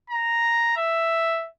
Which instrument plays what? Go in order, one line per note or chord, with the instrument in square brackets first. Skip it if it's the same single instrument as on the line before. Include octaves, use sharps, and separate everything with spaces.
[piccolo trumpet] A#5
E5